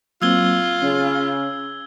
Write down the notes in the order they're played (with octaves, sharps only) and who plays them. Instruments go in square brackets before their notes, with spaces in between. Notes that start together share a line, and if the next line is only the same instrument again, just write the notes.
[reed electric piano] F#3 A#3 C4 [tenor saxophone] F4 [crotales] E6 G#6 G7
[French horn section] C#3 [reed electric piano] C#4